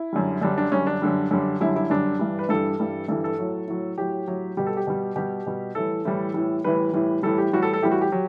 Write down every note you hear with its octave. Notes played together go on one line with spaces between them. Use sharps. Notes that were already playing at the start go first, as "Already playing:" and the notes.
Already playing: E4
F#2 D3 G3
F#2 D3 G3 D4
D4
F#2 D3 G3 C#4
D4
F#2 D3 G3
F#2 D3 G3
F#2 D3 G3 E4
E4
F#2 D3 G3 D4
G2 E3 G3
B4
G2 E3 G3 A4
G2 E3 G3
G2 E3 G3 A4
A4
A2 F#3
A2 F#3
A2 F#3 G4
A2 F#3
B2 G3 G4
A4
G4
B2 G3
B2 G3 G4
B2 G3
A2 E3 G3 A4
A2 E3 G3
A2 E3 G3
A2 E3 G3 B4
A2 E3 G3
A2 E3 G3 A4
G4
A2 E3 G3 F#4
A4
A4
A2 E3 G3 G4
F#4
G4
F#3